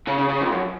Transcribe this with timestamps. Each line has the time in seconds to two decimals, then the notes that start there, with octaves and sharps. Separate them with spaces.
0.08 C#3
0.19 C#3
0.29 C#3
0.41 F2
0.52 F#2